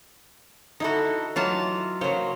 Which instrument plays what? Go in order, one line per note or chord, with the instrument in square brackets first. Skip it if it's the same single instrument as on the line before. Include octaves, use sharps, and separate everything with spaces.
[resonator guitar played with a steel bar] D3 E4 A4 [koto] D#4 F#4
[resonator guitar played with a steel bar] E3 [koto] F#3 F4 A5
[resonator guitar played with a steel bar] C#3 A#3 C5 [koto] F#3 C#5